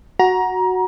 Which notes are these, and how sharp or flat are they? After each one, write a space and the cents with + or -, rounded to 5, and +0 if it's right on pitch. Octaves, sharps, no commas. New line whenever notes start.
F#4 +0 A#5 +25